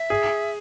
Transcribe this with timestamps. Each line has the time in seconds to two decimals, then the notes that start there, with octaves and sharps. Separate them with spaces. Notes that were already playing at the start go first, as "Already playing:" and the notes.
Already playing: E5
0.10 G#4